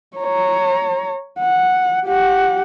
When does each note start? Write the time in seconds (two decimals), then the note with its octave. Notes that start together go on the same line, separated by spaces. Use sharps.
0.17 C#5 A#5
1.39 F#5
2.07 G4 F#5